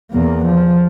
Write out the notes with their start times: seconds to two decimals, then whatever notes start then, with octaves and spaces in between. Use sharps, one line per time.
0.11 E2 A#3
0.46 F3